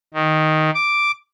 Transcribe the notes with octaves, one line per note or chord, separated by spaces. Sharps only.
D#3
D6